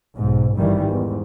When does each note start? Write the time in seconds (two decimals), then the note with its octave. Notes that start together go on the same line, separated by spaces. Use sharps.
0.16 B1 G#2
0.56 G#1 G2 D#3 E3 G3
0.89 E2 G#2